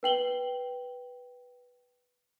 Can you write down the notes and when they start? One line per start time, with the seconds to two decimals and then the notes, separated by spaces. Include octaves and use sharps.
0.03 B4 G5 F#7 G7